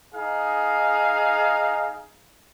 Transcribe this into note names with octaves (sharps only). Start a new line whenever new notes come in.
D#4 G#4 F5